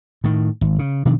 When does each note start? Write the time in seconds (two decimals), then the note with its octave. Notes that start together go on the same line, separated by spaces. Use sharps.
0.24 A2 D#3
0.61 G#1
0.79 C#3
1.05 B2 D#3 F3 D4